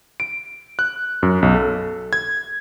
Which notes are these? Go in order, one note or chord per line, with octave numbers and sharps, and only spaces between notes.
D7
F#6
F#2
B1
A4
G#6